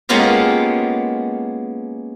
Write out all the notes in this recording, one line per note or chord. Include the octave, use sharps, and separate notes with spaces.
G#3 A#3 B3 C#4 F4 G4